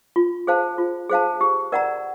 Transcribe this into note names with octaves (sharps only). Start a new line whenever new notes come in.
F4
G#4 C5 F5 A5
F4
G#4 C5 F5 A5
G4
A#4 D5 F#5 A#5